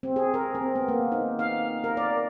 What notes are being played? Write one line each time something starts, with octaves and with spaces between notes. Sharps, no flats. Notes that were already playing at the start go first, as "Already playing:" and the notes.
C4
G#4
A#4
C4
B3
A#3
D#4
F5
A#4
D5